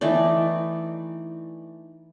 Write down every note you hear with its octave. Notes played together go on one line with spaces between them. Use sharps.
E3 A3 D#4 D5